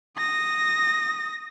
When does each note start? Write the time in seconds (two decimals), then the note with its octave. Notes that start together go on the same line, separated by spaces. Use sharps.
0.17 D#6 A#6